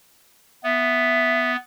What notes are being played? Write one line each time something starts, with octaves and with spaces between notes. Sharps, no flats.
B3 E5